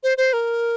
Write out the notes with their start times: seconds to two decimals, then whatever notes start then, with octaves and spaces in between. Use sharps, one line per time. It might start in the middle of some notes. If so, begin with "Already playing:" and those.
0.03 C5
0.18 C5
0.33 A#4